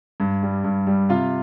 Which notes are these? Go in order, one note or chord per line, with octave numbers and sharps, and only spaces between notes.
G2
G3
G2
G3
C3 F4 F5